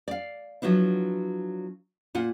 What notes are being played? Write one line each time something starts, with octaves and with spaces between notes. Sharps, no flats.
D5 F5
F3 F#3 B3 D4 E4
A#2 F4 F#5